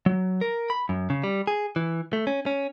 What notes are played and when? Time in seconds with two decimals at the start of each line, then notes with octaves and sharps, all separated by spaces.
0.06 F#3
0.41 A#4
0.70 B5
0.89 F#2
1.10 C#3
1.24 G3
1.47 G#4
1.76 E3
2.13 A3
2.27 C#4
2.46 C#4